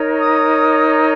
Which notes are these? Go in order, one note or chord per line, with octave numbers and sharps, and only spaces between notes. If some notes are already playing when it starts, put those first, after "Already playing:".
Already playing: D#4 A#4 C#5
D#6